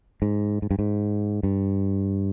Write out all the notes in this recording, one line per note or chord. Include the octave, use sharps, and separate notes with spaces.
G#2
G#2
G2
G#2
G2